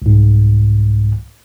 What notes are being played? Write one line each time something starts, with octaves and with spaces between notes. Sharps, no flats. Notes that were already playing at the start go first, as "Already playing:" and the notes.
C2 G#2